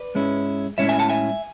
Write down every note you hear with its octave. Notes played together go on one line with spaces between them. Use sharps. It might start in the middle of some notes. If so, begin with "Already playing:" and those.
Already playing: B4 D5
G#2 G#3 C#4 E4
A2 G#3 C#4 E4 C#5 E5
E5 G#5
F#5 A5
E5 G#5